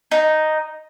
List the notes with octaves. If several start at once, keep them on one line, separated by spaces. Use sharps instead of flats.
D#4